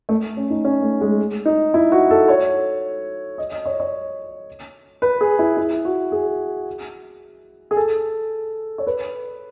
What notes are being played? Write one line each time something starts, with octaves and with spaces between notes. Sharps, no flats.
A3
C#4
D#4
C#4
A3
G#3
D#4
E4
F#4
A4
C#5
D#5
D#5
C#5
C#5
B4
G#4
E4
E4
F#4
G#4
G#4
A4
C#5
B4